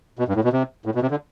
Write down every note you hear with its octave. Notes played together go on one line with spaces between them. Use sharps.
B2
G2
A2
B2
C3
A2
B2
C3
D3